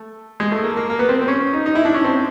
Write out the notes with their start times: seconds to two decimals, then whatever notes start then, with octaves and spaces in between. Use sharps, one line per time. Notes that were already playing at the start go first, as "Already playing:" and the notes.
Already playing: A3
0.40 G#3
0.52 A3
0.64 A#3
0.77 A#3
0.90 A#3
0.99 B3
1.09 C4
1.21 C4
1.28 C#4
1.53 D#4
1.66 D#4
1.75 E4
1.85 D4
1.95 C#4
2.04 C4